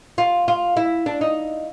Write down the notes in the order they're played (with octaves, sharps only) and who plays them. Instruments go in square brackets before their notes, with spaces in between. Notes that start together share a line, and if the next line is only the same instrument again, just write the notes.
[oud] F4
F4
E4
D4
D#4